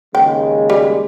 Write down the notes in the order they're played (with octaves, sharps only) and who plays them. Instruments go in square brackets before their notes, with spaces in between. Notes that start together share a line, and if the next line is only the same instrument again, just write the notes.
[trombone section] D#2 C#3 G#3 [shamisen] G5
[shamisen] G3